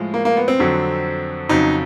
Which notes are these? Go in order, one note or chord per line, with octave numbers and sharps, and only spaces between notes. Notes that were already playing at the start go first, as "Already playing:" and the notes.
Already playing: A2 F3 G#3
A#3
A#3
B3
C4
F2 D3 F#3
F2 C#3 F#3 D#4